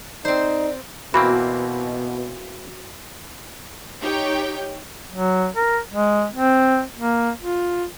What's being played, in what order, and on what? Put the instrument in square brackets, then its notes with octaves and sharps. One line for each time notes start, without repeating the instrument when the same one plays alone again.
[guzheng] C4 C5 [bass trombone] D#4 [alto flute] D5
[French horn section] B2 [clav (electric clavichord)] E3 A#3 C4 [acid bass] F#4 [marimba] B5
[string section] D#4 G4 C#5 G5
[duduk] F#3
A#4
G#3
C4
A#3
F4